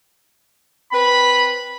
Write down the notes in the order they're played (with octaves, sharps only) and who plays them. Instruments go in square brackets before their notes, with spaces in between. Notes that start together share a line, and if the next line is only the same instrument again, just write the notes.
[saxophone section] C4 B4 [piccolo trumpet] B5